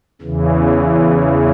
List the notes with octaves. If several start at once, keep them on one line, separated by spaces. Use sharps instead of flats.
E2 C#3 E3